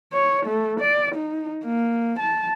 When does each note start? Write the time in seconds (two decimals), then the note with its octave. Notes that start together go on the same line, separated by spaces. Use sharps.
0.13 C#5
0.46 A3
0.80 D5
1.15 D#4
1.64 A#3
2.19 A5